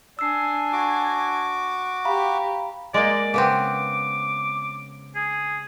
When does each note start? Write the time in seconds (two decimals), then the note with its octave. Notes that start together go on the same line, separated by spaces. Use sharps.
0.19 D4 G#5 E6 C7
0.73 F#4 D6
2.05 G4 F5 A#5 B5
2.94 G#3 A#3 D5
3.34 C#3 B3 C4 D6
5.15 G#4